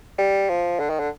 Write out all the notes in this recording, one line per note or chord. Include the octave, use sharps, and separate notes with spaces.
G3
F3
D3
D#3
D3